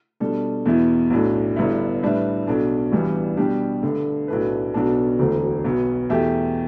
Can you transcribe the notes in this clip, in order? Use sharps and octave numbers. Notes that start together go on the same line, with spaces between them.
B2 G3 D4 A4
E2 B2 B3 E4
B1 A2 A3 D4
G1 G2 D3 B3 E4
A2 G3 D4 B4 E5
B1 B2 A3 D4
A1 G2 E3 G3 B3
B2 G3 D4 G4
G2 D3 A3
B1 A2 A3 D4 B4
B1 B2 B3 D4 A4
E1 D2 D3 A3
B1 B2 B3
E2 B2 A3 G4 E5